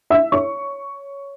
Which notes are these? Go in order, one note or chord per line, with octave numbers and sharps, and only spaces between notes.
E5 E6
C#5 C#6